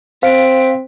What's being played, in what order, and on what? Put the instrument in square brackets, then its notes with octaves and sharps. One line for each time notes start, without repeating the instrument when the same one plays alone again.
[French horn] C4 [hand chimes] C5 [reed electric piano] F5 [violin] B6 D7